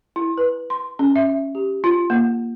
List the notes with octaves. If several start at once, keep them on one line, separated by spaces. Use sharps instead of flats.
E4
B4
C6
C#4
E5
G4
F4
A#3